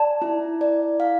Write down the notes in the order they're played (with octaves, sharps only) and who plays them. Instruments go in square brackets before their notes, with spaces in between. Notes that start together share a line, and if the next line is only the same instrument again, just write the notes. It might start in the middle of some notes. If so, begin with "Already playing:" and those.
Already playing: [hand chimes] D5 [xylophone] A5
[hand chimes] E4
D5
F5